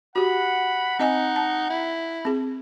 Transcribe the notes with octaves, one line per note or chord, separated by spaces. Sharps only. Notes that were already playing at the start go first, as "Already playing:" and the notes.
F#4 G4 F#5 B5
C4 D#4 D#5 G#5
A5
E4
C4 G#4